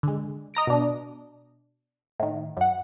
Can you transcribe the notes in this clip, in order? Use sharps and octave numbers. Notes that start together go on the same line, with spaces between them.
D3 G#3
D#5 A#5 A#6 D7
B2 D4
A2 D#3
F#2 F#5